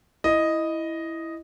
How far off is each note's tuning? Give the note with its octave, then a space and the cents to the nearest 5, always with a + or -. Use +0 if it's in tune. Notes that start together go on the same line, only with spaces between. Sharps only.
E4 +0 D#5 +0